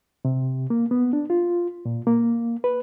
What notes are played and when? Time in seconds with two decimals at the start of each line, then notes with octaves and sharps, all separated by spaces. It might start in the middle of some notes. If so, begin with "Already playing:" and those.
0.25 C3
0.70 A#3
0.91 B3
1.13 D4
1.30 F4
1.85 A#2
2.07 A#3
2.64 B4